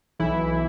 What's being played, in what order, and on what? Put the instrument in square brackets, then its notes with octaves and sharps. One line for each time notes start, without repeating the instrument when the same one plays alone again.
[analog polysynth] B1 E3 E4